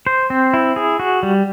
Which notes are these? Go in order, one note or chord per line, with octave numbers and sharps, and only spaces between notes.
C5
C4
E4
G#4
F#4
G3